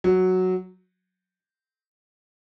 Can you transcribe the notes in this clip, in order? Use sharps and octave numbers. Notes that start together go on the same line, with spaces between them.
F#3